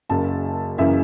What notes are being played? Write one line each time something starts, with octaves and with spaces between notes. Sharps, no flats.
F#1 F#2 C#3 A5
F#1 F#2 C#3 E3 E5